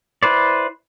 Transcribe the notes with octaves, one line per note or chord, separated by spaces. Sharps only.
E4 B4 C5 D5